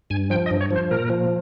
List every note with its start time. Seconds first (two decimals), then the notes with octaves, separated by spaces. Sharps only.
0.10 G2 G#5
0.30 F3 G5
0.46 D#5
0.51 G2
0.61 C#5
0.71 F3
0.76 C5
0.91 A#2 A#4
1.10 F3